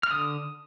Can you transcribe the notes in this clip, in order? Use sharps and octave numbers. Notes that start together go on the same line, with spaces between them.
F6
D3 D#6